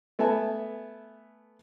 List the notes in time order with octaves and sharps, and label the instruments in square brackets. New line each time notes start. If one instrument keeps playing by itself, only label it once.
[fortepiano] A3 B3 E5 G#5 A5